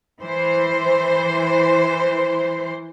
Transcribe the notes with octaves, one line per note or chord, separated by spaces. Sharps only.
E3 C5